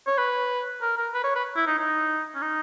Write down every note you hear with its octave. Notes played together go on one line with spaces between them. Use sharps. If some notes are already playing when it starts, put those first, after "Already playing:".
C#5
B4
A#4
A#4
B4
C#5
B4
E4
D#4
D#4
C#4
D#4